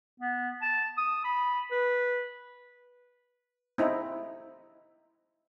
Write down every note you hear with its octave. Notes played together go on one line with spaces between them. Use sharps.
B3
A5
D#6
B5
B4
C4 D#4 E4